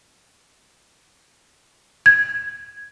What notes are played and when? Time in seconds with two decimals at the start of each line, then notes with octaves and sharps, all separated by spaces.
2.06 G#6